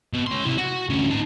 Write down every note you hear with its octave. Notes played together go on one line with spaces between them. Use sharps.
B2
C#4 C6
C3 E4
F#4
D2 C#4
D#4 A5